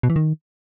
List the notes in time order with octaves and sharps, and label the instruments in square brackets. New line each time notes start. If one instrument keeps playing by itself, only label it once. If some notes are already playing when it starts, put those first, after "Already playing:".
[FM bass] B2
E3
D#3